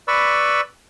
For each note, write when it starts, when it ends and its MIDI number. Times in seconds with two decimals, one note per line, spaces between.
0.08 0.61 71
0.08 0.61 74
0.08 0.61 83
0.08 0.61 85
0.08 0.61 88